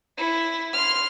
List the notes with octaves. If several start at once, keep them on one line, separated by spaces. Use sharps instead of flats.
E4
C6 F6